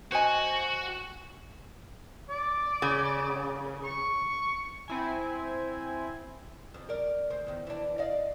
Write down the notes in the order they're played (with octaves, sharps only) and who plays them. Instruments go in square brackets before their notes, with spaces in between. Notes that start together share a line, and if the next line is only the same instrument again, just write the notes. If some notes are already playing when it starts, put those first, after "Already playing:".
[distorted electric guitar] F#4 [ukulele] C5 D#5 G#5
[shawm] D5
[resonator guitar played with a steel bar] C#3
[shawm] C#6
[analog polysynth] C4 E4 G#5
[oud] F2
A#4 D5
D2 C5
E2 D#3
E3 D4
D5 D#5 F5